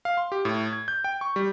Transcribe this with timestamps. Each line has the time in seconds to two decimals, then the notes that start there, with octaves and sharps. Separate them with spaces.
0.05 F5
0.17 C6
0.32 G4
0.45 A2
0.73 G#6
0.88 G6
1.04 G5
1.21 C#6
1.36 G3